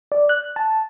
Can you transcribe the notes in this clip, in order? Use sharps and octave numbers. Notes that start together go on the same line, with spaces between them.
D5
F#6
A5